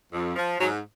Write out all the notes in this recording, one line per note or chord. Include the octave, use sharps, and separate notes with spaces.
F2
F3
G#2 F#3